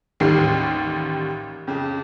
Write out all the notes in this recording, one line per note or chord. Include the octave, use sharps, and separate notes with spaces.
A1 D#2 D#3 G3 C7
F2 C#3